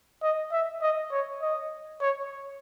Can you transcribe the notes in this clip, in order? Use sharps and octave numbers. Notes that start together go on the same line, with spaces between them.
D#5
E5
D#5
C#5
D#5
C#5